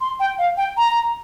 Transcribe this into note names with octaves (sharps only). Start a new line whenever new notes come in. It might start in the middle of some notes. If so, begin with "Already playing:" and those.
C6
G5
F5
G5
A#5